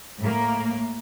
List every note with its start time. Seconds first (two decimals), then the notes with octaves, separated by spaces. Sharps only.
0.20 A2 A#3